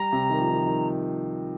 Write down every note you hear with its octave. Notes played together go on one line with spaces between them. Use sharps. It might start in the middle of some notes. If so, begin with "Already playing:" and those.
Already playing: G3 A#5
C3
D#3
F3
D#3
F3
D#3